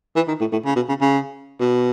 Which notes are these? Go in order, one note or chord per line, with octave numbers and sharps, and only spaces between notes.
E3
D#3
A2
A2
C#3
B2
C#3
C#3
B2